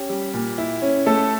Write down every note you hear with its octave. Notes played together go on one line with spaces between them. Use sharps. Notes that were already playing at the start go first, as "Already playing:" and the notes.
Already playing: C#4 G4
G3
A#2
E4
C#4
A3 A4